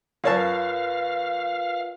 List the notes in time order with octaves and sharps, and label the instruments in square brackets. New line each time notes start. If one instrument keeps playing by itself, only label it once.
[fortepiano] F#2 C#5 A5 [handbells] F4 A#4 B4 [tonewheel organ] F5